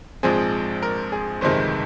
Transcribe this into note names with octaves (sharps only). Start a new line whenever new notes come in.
A#1 G#2 F3 C4 G#4
A#4
G#4
G1 F2 C3 D#3 G#3 C5